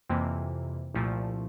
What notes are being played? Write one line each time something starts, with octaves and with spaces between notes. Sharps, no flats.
F2 C3 E3 A#3
C2 A#2 F3 A3